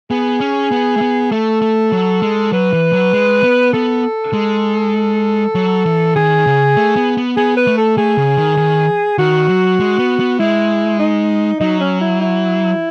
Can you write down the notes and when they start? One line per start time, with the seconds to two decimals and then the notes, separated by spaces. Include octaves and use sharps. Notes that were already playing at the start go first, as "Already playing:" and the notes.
0.11 B3 G#4
0.40 C#4
0.71 B3
0.97 A3
1.02 B3
1.32 A3 A4
1.62 A3
1.92 F#3
2.22 G#3
2.52 F#3 B4
2.73 E3
2.93 F#3
3.13 G#3
3.43 B3
3.73 B3 A4
4.34 G#3
5.55 F#3
5.86 E3
6.16 D#3 G#4
6.47 C#3
6.76 A3
6.96 B3
7.17 B3
7.36 B3 G#4
7.57 B4
7.67 A3
7.78 A4
7.97 A3 G#4
8.17 C#3
8.37 D#3
8.57 D#3
9.18 D#3 F#4
9.49 F#3
9.79 G#3
9.99 B3
10.20 B3
10.39 G#3 E4
10.99 D#4
11.60 F#3 D#4
11.80 C#4
12.01 E4
12.21 E4